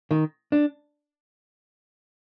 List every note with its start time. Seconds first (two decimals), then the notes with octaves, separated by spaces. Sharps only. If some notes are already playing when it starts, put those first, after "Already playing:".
0.11 D#3
0.52 D4